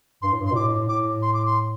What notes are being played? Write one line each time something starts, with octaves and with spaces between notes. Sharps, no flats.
G2 C6
A2
G2
C6
B2
A2 D6
A2 D6
C6
D6
C6